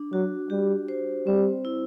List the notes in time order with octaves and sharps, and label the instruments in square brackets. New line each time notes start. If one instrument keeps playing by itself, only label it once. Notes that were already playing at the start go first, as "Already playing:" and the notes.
Already playing: [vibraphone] D4
[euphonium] F#3 [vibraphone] F#4
[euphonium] G3 [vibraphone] G4
[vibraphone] C5
[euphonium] G3 [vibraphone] C4
[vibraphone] E4